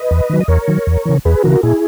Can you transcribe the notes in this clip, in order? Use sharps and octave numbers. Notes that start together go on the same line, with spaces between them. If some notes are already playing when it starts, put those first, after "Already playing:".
Already playing: B4 D#5
E2
D#3 F#3
D#5
E2 A#4 C#5
D#3 F#3
E2
C#3 E3
E2 G#4 B4
C#3 E3 F#4 A#4
A#2 E4 G#4